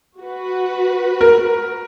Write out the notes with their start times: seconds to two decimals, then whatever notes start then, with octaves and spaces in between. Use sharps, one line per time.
0.19 F#4 B4
1.21 A#4